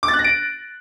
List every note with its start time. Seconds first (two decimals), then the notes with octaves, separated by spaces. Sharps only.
0.03 D6
0.08 A6
0.14 F#6
0.19 A#6
0.24 D7